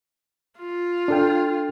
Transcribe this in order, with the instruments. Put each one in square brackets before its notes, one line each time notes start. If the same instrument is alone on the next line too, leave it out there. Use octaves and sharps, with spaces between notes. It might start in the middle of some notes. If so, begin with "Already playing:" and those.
[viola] F4
[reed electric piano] D4 A4 G5